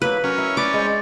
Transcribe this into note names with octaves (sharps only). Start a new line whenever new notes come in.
F#3 A#3 B4 B5
F#3 C#4 A#4
E4
B4 D5 D6
G#3 C5